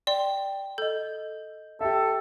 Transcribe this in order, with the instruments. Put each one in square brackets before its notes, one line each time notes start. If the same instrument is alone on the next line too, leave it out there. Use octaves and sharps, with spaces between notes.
[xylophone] D5 C6 [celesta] G5
[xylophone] A4 [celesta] D#5 G6
[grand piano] G4 E5 [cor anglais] A4